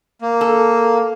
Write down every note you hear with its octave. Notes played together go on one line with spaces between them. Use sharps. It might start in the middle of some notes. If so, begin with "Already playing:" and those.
A#3
A4